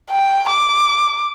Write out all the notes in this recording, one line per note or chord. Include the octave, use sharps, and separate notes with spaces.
G5
D6